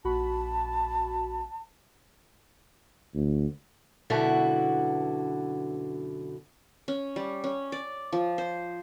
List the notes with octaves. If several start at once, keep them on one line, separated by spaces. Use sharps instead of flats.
A#1 F#4 A5 B5
D2
F#2 B2 D3 B3 E4 F#4
C#4
G3
C#4
D5
F3
C5